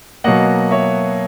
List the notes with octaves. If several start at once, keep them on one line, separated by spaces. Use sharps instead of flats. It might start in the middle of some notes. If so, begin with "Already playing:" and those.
B2 F#3 A#3 D#5 F#5
C#5 E5